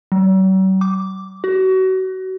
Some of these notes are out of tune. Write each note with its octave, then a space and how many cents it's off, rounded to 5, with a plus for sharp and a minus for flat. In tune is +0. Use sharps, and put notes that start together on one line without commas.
F#3 +45
D6 -5
F#4 +30